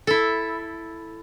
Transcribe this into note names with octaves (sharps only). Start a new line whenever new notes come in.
E4 A4